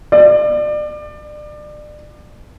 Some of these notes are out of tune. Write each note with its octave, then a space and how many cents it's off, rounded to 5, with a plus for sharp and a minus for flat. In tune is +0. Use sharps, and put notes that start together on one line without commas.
D5 +30